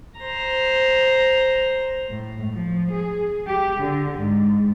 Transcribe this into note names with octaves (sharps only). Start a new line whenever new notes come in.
C5 A#5
A2
F3
G#4
G4
D3
G#2